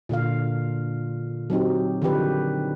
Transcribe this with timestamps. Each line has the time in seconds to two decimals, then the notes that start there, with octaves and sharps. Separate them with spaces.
0.09 A#2 D3 F4 F5
1.50 F#3 C4 D#4 G4
2.02 D3 D#3 F3 G4 B4